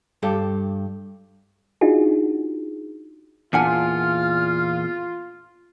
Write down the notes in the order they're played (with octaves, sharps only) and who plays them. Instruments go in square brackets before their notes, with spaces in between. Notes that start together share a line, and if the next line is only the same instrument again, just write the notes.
[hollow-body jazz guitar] G2 G4 A4
[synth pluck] D4 D#4 F4 F#4 G#4
[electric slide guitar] E2 A#2 [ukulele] D4 F#5 G#5 [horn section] F4 [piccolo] F6